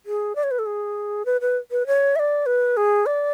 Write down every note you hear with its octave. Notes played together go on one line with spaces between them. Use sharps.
G#4
D5
C#5
B4
A4
G#4
B4
B4
B4
C#5
E5
D5
B4
G#4
D5